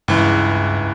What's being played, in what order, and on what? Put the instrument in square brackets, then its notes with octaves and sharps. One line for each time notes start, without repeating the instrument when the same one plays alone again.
[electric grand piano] C#2 E3 [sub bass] G2